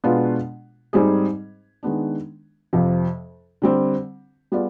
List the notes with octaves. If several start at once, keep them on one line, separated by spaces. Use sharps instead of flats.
B2 G#3 B3 D4 F4
G#2 G3 C4 D#4 G#4
D#3 G#3 B3 D4
F2 C3 F3
D3 G3 C4
G3 B3 F4 G#4 D5